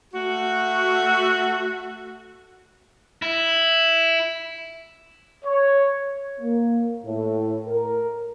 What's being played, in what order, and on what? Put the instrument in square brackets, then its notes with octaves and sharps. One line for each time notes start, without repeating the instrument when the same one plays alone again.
[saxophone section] A3 F#4
[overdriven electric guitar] E4
[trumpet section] C#5
[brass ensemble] A#3
A2
A#4